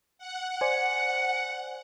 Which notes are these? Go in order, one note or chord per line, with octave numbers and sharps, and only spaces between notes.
F#5
C5 D5 G#5 C#7